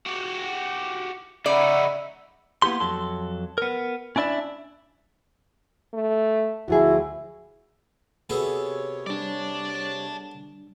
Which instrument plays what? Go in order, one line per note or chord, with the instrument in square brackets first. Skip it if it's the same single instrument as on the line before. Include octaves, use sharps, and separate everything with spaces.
[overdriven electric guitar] F#4 G4
[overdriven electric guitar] C#3 D#4 [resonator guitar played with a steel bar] D5 [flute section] E5 F#5 B5
[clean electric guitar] A#3 B3 E4 G4 C6
F2 F#3 A4 C6
B3 A#4
C#4 D4 E4 D5 E5
[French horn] A3
[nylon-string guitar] D2 F3 G#4 [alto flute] E4 [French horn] F#4
[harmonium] C3 C#5 [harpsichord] B3 G#4 A4 [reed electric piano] F#4 E6
[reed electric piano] G3 D4 [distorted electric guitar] D5 A5